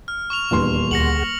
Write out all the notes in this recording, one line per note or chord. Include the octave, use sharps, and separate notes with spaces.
F6
C#6 F6 F7
D#1 E2 D4 C6
D2 G#4 F#5 A#6 C#7 F#7